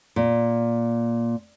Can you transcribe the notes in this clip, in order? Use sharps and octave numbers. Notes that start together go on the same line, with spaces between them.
A#2